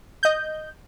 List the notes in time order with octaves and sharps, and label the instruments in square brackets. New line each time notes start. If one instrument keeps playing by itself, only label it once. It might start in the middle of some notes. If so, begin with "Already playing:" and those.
[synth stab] D#5 G6